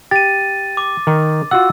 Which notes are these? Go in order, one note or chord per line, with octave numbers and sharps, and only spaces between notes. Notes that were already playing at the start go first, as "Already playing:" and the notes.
G4 A6 D#7
D6
D#3
F4 F#4 F#5 E6